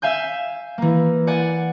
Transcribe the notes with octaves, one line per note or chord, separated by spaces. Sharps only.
E5 F5 G#5 G6
E3 A#3
D5 F#5 G#5 A6